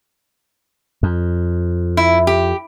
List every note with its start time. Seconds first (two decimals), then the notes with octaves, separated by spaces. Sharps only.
1.03 F2
1.97 E4
2.27 G4